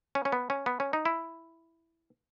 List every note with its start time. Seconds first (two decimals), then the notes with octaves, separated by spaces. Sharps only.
0.15 C#4
0.25 C#4
0.32 B3
0.50 C#4
0.66 B3
0.80 C#4
0.93 D#4
1.05 E4